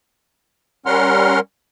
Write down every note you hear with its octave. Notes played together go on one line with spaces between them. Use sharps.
G3 C#4 A#4 F#5 C6 F6